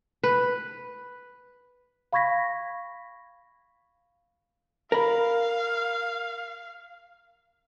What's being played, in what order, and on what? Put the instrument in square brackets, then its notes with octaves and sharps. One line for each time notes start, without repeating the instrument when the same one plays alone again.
[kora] B4
[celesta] F5 B5 C#6 G#6 A#6 B6
[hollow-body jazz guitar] A#4 B5 [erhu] F5